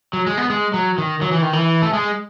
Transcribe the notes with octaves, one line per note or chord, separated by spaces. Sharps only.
F#3
G#3
B3
G#3
F#3
D#3
F#3
E3
D#3
E3
A3
G#3